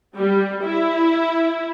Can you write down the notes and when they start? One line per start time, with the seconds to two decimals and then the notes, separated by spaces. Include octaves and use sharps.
0.16 G3
0.63 E4